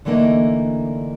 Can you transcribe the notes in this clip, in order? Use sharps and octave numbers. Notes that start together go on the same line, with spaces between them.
D3 E3 A3 A#3 D4 D#4